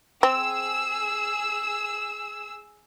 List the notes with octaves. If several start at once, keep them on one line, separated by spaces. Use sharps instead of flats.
C4 G#4 E6